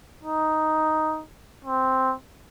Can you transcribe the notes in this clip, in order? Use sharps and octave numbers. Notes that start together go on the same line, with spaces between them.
D#4
C4